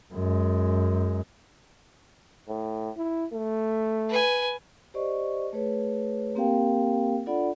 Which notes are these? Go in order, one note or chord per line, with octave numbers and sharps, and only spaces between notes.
F#2 G#3
A2
E4
A3
B4 G#5
G4 C5 D5 D#5 C#6
A3 G#4 B4 C#5
A#3 C4 G4 A#4 F5 G5
D4 F4 A4 D5 F#5 B5